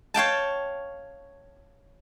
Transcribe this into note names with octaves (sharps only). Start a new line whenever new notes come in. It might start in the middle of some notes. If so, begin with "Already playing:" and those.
C#5 F5 G5 A5